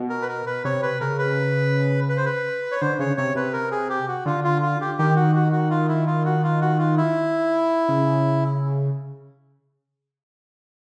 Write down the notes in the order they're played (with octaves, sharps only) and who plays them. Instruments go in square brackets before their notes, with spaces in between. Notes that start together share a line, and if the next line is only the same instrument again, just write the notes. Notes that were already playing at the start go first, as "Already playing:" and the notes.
Already playing: [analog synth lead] B2
[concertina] A#4
B4
A#4
B4
[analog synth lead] C3 [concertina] C#5
[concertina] B4
[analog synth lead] C#3 [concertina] A#4
[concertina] B4
B4
C5
B4
C#5
[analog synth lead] D3 [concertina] C5
[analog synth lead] C#3 [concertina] C#5
[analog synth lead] C3 [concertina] C#5
[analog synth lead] C3 [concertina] B4
[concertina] A#4
G#4
G4
F#4
[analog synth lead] D3 [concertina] F4
[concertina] F4
F4
G4
[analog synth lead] D#3 [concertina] G4
[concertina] F#4
F#4
F#4
F4
E4
F4
F#4
F4
F#4
F4
E4
[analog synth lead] C#3